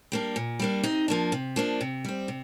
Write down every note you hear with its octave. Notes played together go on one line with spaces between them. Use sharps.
G3 A#3 D4
A#2
G3 A#3 D4
C3 D#4
F3 A#3 D4
C3
F3 A#3 D4
C3
G3 C4
C3